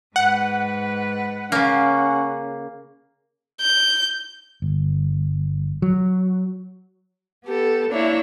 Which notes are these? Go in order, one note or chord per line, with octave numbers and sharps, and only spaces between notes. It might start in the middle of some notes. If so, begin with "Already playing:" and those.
G#2 B4 F#5
C#3 A#3 C#4
G6
G1
F#3
B3 G4 A4
A#3 D4 E4 C#5 E5